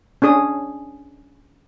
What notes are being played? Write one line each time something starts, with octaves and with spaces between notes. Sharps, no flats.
C#4 D4 G#4 D#6